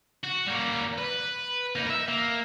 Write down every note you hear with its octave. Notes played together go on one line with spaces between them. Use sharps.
F#4
G3 A#3
B4
A#3 D#4
A#4 E5
A#3